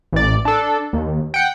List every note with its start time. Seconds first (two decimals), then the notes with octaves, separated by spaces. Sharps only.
0.13 A1 D5
0.45 D4 A4
0.93 D#2
1.34 F#5 G5